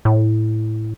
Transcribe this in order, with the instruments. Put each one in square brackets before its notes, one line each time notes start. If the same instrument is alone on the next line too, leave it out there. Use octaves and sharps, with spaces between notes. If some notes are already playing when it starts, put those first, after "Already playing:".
[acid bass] A2